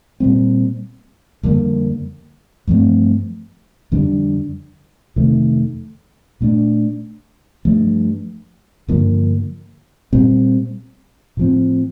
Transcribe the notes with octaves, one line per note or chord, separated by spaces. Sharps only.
A#2 G3 C4
F2 D3 G3 A#3
G2 F3 A3 C4
F2 D3 G3 D4
F2 C3 D#3 A3
A#2 A3 D4
G2 F3 A3
G2 D3 F3 A#3
A#2 G3 C4
A2 F3 C4